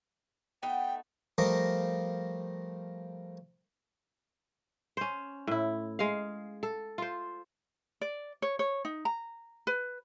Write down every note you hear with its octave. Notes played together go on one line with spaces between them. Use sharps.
A3 B3 D#4 G5
F3 G3 A3 A#4 D#5 F5
C#4 C5
A2 E4
G#3 F5
A4
F4 C5
D5
C#5
C#5
D#4
A#5
B4